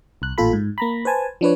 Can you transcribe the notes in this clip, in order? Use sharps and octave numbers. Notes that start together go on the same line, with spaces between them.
C2 F#6
A1 A#2 F4 A4 B5
G#2
A#3 A#5 B5
B4 C5 G#5 A5
F3 D4 B4 C#5